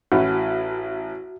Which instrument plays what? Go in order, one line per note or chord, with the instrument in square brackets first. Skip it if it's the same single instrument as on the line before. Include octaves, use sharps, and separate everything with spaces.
[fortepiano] A1 C#4 E4 [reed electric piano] F#4